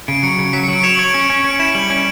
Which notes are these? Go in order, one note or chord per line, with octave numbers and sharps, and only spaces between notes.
C#3 D7
F#3 C#7
C#3
F#3 B6
C#7
F#3 D7
C#5 E7
F#7
C#5 D7
C#4 C#7
C#4 C#7
C#4 D7
E4 E7
G3 F#7
C#4 D7